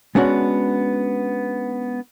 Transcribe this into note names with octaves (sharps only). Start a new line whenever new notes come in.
G#3 B3 C#4 D4 F#4